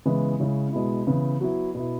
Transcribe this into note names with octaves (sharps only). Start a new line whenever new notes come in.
C#3 E3 G#3 B3 E4
C#3 G#3 C#4 E4
B2 G#3 B3 E4
C#3 E3 B3 E4
F#3 B3 E4
B2 B3 E4